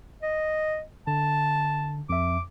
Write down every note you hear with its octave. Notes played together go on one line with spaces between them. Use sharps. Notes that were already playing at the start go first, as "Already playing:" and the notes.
D#5
D3 A5
F2 E5 D6